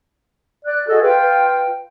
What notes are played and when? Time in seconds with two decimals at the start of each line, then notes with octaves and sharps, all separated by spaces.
0.65 D5 F#6
0.88 F#4 G#4 A4 D#5
1.03 F4 B4 G5
1.21 B4